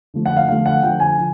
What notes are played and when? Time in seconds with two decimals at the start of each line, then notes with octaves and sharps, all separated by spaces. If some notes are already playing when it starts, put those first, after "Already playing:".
0.14 D3 F3 A3
0.26 F#5
0.37 F5
0.48 D3 F3 A3 F5
0.66 F#5
0.83 D3 F3 A3 G5
1.00 G#5
1.18 D3 F3